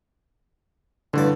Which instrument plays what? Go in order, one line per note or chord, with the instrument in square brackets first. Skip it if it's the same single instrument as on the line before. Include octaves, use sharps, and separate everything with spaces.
[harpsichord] A1 G2 D5 [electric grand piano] D3